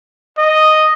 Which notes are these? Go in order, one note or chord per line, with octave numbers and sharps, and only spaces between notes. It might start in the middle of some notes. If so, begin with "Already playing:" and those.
D#5